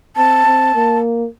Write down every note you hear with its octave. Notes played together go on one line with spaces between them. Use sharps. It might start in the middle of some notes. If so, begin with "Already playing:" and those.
C4 A5
C4
A#3